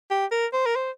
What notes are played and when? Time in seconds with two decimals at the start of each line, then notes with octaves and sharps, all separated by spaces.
0.11 G4
0.32 A#4
0.53 C5
0.66 A#4
0.76 C5